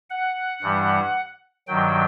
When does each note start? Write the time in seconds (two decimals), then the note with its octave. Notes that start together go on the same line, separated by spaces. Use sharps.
0.10 F#5
0.62 G2 E3 G3
1.68 G2 D#3 F#3 G5